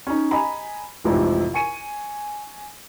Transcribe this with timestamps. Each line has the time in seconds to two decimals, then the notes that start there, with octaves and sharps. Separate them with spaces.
0.07 C#4 D#4
0.31 D#5 G#5 A#5 B5
1.04 A1 F2 G#2 C3 C#5
1.54 G#5 C#6 C#7 D#7